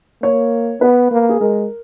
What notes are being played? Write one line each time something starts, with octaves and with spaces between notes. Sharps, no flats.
A#3 C#5
B3 B4
A#3
G#4
G#3 A#4